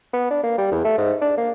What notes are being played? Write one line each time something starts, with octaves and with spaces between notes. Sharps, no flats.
B3
D4
A#3
G3
E2
A3
G#2
D4
A#3